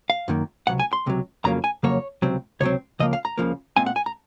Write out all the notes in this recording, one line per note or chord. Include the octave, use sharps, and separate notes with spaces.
F5
F#2 D#3 A#3
C#2 C3 F#3 F#5
G#5
C6
C#2 C3 F#3
F2 C#3 F#3 A#3 A#5
G#5
F2 C#3 F#3 A#3 C#5
C#2 C3 F#3 C4
C#2 C3 F#3 C4 C#5
C#2 C#3 F3 A#3 D#5
F5
A#5
C#2 C#3 F3 A#3
A#2 G#3 C4 G#5
F#5
G#5
A#5